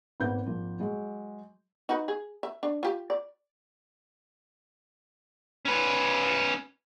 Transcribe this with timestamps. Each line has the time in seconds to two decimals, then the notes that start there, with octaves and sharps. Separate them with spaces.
0.20 G#1 A#3 B3 G6
0.46 G#1 F3 A#3
0.80 F#3 G#3
1.89 D#4 F#4 B4
2.08 G#4
2.43 E5
2.63 D4
2.83 F4 G4
3.10 D5
5.65 C#4 B4